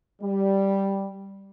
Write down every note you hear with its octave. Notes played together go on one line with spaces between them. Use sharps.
G3